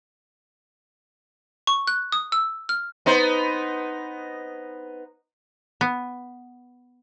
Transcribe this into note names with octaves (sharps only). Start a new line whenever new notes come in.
C#6
F#6
D#6
E6
F6
B3 D#4 C5
B3